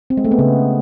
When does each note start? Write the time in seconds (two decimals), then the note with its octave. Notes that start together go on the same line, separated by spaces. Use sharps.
0.10 C4
0.17 G#3
0.25 A3
0.32 B3
0.39 C#3